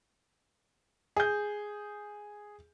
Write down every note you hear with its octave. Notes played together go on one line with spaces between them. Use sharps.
G#4 G6